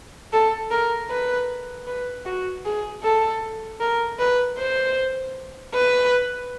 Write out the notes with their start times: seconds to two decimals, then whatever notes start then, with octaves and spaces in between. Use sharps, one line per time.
0.33 A4
0.71 A#4
1.10 B4
1.87 B4
2.26 F#4
2.65 G#4
3.03 A4
3.80 A#4
4.19 B4
4.58 C5
5.74 B4